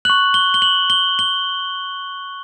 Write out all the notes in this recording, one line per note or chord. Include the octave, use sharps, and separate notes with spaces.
C#6 F#6 F#7
G7
G7
F#7
G7
G7